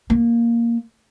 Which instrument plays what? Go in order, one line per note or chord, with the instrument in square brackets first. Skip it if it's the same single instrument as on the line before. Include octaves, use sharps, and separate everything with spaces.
[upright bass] A#3